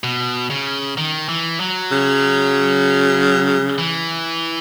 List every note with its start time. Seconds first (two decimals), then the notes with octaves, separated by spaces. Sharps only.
0.04 B2
0.50 C#3
0.98 D#3
1.29 E3
1.60 F#3
1.92 C#3
3.78 E3